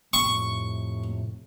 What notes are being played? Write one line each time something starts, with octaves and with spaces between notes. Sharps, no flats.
F2 A2 C3 C#6